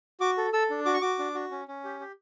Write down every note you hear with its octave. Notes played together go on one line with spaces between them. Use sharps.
F#4 D6
A4
A4 E6
D4
F#4 D6
C#6
F#4 D6
D4
F#4
C#4
C#4
G4
G4